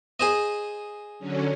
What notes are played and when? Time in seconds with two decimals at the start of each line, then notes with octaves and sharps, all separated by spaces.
0.20 G#4 C5 D#5
1.19 D3 F#3 C#4